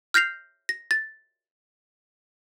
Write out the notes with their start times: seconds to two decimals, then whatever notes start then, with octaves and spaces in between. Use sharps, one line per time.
0.14 F6 G6 A#6 C7 F7
0.69 A#6
0.91 A6